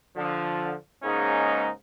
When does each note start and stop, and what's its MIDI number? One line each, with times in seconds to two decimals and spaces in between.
0.17 0.73 50
0.17 0.73 53
1.03 1.68 44
1.03 1.68 49
1.03 1.68 56
1.03 1.68 58
1.03 1.68 61
1.03 1.68 63